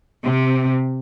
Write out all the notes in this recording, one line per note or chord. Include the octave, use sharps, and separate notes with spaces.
C3